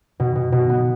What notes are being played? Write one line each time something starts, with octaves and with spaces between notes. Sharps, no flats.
B2
B2
B2
B3